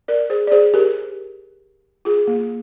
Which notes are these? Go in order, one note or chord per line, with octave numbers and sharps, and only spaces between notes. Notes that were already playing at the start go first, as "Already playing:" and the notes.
A#4 D5
G#4 C5
D5
G#4 C5
G4 A#4
F4 G#4
A#3